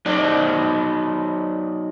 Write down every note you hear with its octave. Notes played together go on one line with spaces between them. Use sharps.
F#3 D#4 F#4 D5